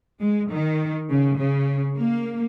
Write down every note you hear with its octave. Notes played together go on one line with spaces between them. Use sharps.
G#3
D#3
C#3
C#3
A#3